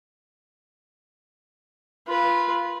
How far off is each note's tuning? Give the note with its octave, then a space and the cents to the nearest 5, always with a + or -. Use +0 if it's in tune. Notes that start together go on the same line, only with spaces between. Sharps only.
F4 -15 B4 -10